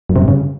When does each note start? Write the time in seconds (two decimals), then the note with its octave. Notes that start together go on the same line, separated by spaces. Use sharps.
0.09 F#2
0.16 C3
0.22 G2
0.28 C#3